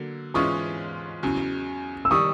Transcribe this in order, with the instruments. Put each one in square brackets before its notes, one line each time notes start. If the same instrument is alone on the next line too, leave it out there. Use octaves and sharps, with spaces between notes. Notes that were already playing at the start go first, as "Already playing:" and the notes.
Already playing: [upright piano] D3 F#3 A#3
[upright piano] G#2 E3 G#3 C#4 F4 [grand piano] C#6 D#6
[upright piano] E2 C#3 F#3
[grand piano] E6
[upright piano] D#3 G3 [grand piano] C#6 D#6